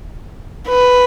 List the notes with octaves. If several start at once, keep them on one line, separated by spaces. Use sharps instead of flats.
B4